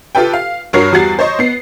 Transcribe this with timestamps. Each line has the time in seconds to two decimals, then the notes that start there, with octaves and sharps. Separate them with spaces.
0.15 F4 G4 A4 B4 G5
0.33 F5
0.73 G2 F#4 A#4 C#5 C7
0.92 E2 G3 F#4 A6 C7
1.19 C5 C#5 D#5 C#6
1.39 B3 C7